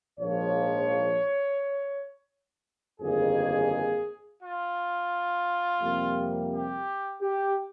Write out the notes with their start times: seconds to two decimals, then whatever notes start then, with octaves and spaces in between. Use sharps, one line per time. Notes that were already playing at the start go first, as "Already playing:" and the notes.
0.20 A#1 G#2 F3 A#3 C#5
3.00 G1 F2 D#3 A#3 G#4
4.41 F4
5.81 F2 C3 G3 A#3
6.51 G4
7.22 G4